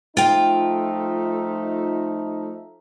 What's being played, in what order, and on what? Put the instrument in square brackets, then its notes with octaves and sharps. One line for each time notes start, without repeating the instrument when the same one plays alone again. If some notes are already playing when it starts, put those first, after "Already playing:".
[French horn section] F3 A3 D#4 [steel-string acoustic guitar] F4 G5